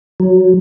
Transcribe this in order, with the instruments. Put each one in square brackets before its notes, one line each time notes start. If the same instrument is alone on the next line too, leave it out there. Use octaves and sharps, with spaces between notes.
[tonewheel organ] F#3